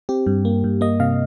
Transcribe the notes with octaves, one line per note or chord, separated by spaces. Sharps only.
C4 G4
G2
A#3
G2
A#3 D#5
C3 F5